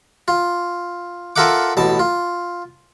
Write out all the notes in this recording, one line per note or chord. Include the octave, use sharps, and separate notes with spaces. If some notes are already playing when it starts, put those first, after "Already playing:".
F4
F4 A4 A#4 E5 F#5 D6
A1 B2 A5
F4